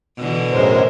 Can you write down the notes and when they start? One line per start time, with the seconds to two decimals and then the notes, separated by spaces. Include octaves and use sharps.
0.17 B2 D3 E3
0.53 F#2 A2 G#3 A#4 C5